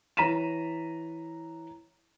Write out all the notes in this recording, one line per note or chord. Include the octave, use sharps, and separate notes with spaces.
E3 C#5 A#5 B6 D#7 E7